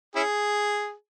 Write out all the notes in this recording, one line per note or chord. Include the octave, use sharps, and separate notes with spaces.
C#4 E4 G#4